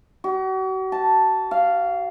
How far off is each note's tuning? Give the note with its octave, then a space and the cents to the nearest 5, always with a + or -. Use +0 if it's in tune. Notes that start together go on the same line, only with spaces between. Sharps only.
F#4 +40
A5 +0
F5 -10